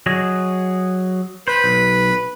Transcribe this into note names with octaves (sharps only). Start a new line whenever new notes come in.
F#3 G#4 D#5
B4 C5
B1